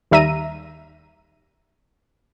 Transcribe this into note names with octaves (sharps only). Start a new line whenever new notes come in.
D#2 G3 E5 A#5 D#7